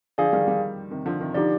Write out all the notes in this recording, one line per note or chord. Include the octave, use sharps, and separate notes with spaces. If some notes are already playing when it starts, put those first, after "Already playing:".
D3 F3 G#4 D5 F5 G#5
D#3 G3
D#3 G3
C3 D#3
D3 F3
C3 D#3
D3 F3 D#4 G4 D5